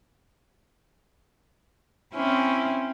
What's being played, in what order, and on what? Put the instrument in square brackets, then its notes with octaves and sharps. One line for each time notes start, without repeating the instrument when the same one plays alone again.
[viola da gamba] C4 C#4 E4